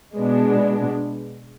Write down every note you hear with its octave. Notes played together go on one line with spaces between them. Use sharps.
B2 G#3 B3 D4